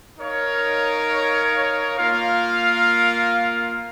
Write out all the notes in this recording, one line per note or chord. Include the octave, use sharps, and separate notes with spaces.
D#4 A#4 C#5 F5
A#3 F4 A#4 F5